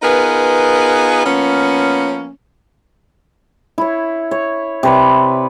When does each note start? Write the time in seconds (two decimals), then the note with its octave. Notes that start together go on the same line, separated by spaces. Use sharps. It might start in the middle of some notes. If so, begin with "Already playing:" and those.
0.02 B3 D#4 F4 G#4 A#4 B4
1.25 F3 A#3 B3 C#4
3.78 E4 C#5
4.31 C#5
4.83 C3 B4 D5